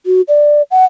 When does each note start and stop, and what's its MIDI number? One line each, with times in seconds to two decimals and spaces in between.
0.06 0.21 66
0.28 0.62 74
0.71 0.85 78